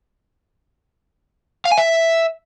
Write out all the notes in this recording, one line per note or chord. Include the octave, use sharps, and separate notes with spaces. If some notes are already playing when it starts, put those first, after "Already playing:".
F5
G#5
E5